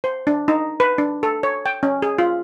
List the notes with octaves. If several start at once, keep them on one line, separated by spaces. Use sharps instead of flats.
C5
D4
D#4
B4
D4
A4
C#5
G5
C#4
G#4
F4